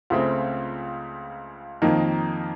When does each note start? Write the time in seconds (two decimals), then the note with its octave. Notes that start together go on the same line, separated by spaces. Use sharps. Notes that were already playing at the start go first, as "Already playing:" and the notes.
0.10 C#2 C#3 A3 C4
1.82 F2 D#3 A#3 D#4